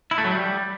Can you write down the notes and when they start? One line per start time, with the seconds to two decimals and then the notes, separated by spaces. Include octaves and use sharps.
0.11 E4
0.18 A3
0.25 F#3
0.31 G3